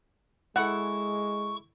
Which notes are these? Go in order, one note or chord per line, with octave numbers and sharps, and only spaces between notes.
G#3 E4 A4 F#5 C#6